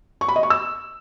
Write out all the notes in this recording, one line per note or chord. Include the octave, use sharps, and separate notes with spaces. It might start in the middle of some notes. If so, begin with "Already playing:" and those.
C#6
B5
D#5
C#6
E6